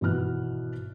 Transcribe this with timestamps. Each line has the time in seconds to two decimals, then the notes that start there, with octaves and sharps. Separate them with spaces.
0.01 G#1 B2 E3 B3 F6 F#6